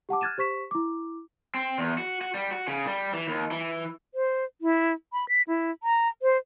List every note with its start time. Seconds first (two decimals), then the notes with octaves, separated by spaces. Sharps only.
0.09 G4 F#5 A5 D6
0.21 F6 F#6 G#6 A6 D#7 E7
0.38 G4 C5 C#6 B6 E7
0.71 E4 D6
1.54 C4
1.78 E2
1.98 F#4
2.21 F#4
2.34 G3
2.51 F#4
2.68 C#3
2.87 G3
3.14 E3
3.28 D#2
3.51 E3
4.15 C5
4.61 E4
5.13 B5
5.29 B6
5.48 E4
5.83 A#5
6.22 C5